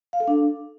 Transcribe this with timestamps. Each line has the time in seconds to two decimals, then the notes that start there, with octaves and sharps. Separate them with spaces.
0.13 F5
0.20 A4
0.28 D4